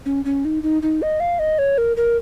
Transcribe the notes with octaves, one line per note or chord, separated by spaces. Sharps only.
C#4
C#4
D#4
D#4
D#4
D#5
F5
D#5
C#5
A#4
A#4